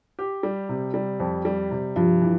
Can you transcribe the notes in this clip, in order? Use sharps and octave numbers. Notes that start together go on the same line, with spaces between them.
G4
G3
C3
G3
F2
G3
C3
G2 F3 F4
E3